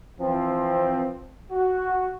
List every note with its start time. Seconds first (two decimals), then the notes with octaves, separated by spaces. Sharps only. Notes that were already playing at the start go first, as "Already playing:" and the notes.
0.20 E3 F3 C4
1.51 F#4